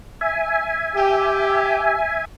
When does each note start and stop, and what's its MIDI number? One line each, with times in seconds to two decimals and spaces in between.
0.21 2.25 76
0.21 2.25 80
0.96 1.98 67